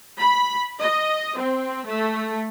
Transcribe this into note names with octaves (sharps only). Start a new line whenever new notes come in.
B5
D#5
C4
A3